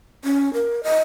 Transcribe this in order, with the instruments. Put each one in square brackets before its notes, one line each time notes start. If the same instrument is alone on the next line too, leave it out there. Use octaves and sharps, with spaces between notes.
[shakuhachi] C#4
A#4
D#5